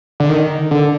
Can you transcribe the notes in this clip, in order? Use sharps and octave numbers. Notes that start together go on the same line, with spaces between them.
D3
D#3
D3